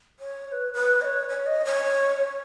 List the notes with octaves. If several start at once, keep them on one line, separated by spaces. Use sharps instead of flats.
C#5
C#5
B4
B4
D#5
C#5
C#5
D#5
C#5